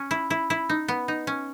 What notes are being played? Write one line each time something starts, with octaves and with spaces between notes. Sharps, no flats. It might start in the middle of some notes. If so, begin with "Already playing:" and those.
Already playing: C#4
E4
E4
E4
D#4
B3
D#4
C#4